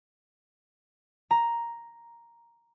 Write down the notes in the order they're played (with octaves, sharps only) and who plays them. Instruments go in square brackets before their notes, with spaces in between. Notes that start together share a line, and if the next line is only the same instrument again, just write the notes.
[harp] A#5